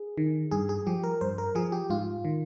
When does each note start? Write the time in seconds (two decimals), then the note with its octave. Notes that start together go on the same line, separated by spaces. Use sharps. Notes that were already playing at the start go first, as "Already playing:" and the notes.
Already playing: G#4
0.18 D#3
0.51 G2 G#4
0.69 G#4
0.87 F3 G4
1.04 A#4
1.21 G2 C5
1.38 A#4
1.55 F3 G#4
1.72 G4
1.90 G#2 F4
2.25 D#3